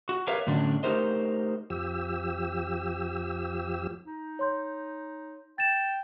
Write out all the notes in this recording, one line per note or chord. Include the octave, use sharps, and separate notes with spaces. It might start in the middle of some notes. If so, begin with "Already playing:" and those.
F#4
G4 A#4 B4 C#5 E5 F5
A2 D3 F#3 C#4 D4
A3 D#4 G4 A#4 C5 D#5
F2 F3 G4 E6
D#4
C#5 C6 G6
G5 A6 E7